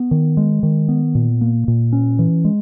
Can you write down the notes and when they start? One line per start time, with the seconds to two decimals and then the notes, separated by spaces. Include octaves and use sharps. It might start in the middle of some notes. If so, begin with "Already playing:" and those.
Already playing: B3
0.11 D#3
0.37 G#3
0.63 D#3
0.88 B3
1.15 A#2
1.41 A#3
1.68 A#2
1.93 C#4
2.19 E3
2.45 G#3